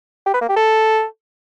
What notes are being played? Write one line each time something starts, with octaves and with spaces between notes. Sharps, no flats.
G4
B4
A#3
G4
A4